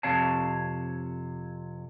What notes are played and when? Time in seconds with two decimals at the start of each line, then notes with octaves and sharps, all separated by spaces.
0.03 F2 C3 C#5 F5 A5